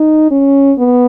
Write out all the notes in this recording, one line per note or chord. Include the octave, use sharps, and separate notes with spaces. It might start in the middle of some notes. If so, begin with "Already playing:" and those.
Already playing: D#4
C#4
B3